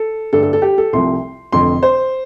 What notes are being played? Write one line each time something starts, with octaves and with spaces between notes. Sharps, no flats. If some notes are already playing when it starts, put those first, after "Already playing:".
Already playing: A4
G2 D3 A3 D4 A4
A4
A4
G4
A4
C2 C3 F3 A3 C6
F1 F2 D3 C6
C5